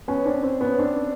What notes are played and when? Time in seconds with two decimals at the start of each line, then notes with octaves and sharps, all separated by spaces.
0.08 B3 C#4
0.25 C4 D4
0.43 C4
0.61 B3 C#4
0.79 C4 D4